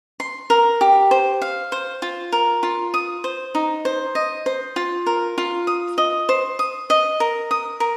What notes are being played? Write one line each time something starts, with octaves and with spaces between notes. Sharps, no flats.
C6
A#4
G4
C5
F5
C5
F4
A#4
F4
D#6
C5
D#4
C5
D#5
C5
F4
A#4
F4
D#6
D#5
C5
D#6
D#5
A#4
D#6
A#4